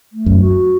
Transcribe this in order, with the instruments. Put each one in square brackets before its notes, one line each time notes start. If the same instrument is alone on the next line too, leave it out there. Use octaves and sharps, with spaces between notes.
[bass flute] A3
[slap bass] F#2
[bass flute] F#4